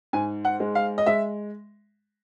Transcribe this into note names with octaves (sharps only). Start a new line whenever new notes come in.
G#2 G#5
F#5
G#3
F5
D#5
G#3 E5